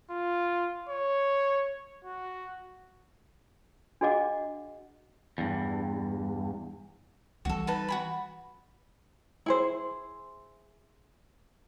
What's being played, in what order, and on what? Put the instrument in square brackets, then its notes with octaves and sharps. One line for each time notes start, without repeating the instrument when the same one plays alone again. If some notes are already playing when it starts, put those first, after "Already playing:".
[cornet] F4
C#5
F#4
[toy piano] D4 F#4 G#4 D#5 F#5 D6
[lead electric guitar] E2 G2
[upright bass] E3 G3 [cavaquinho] F#4 A4
[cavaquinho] D#4 B4 A5
F#4 G#4 B5
[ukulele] E4 G#4 C5